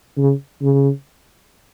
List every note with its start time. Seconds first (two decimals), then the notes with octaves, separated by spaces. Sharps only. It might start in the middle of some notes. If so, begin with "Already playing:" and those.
0.18 C#3
0.62 C#3